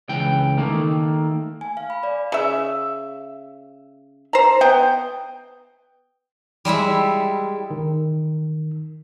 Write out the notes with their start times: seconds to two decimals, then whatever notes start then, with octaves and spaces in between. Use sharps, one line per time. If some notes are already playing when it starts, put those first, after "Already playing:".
0.09 C#2 E3 G5
0.57 D#3 A3 A#3
1.61 G#5
1.77 F5
1.90 B5
2.03 D5
2.32 C#3 E5
4.33 C5 A#5
4.61 B3 G5
6.65 G3 G#3 E4 E5
7.71 D#3